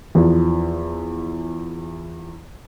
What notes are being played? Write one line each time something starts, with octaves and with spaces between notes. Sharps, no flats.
E2 F3